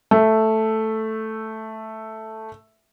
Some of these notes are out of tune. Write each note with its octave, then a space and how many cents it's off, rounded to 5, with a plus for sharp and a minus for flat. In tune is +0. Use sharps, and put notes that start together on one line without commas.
A3 +0 E5 +0